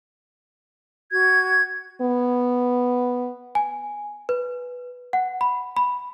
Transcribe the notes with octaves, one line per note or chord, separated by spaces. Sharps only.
F#4 G#6
B3
G#5
B4
F#5
B5
B5